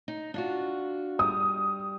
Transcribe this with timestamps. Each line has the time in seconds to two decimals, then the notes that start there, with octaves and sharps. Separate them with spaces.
0.08 D#4
0.34 D4 F4 F#4
1.19 G3 D#6